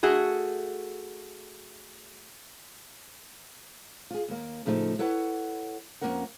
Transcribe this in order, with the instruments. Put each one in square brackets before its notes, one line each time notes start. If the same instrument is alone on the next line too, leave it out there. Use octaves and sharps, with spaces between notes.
[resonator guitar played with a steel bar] A3 F#4 G#4
[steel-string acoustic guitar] F4 G#4
D#2 A#3
A2 C#3 F3 A3 D#4
E4 A4 B4 C#5 F#5
F2 E3 A#3 C#4 A#4 F#5